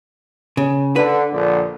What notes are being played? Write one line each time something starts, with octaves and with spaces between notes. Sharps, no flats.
C#3
D3 B4
A#1 D3